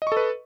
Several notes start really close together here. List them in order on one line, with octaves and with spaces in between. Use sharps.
D#5 C#6 A4 B4